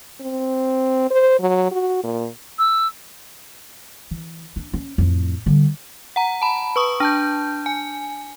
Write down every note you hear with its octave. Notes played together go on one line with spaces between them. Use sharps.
C4
C5
F#3
F#4
A#2
E6
E3
D4
C#4
F2 A2
D3 G3
F#5 A#5
A5 B5
B4 C#6 D#6
D4 A5 G6
G#5